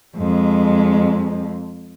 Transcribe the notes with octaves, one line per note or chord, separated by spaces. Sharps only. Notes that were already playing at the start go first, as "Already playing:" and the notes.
F2 G#3